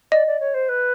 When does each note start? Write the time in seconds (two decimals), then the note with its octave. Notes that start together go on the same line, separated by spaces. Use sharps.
0.12 D5 D#5
0.27 D5
0.40 C#5
0.54 C5
0.69 B4